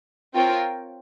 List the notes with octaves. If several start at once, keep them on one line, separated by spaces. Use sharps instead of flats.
C4 F4 A#4 C#5 G5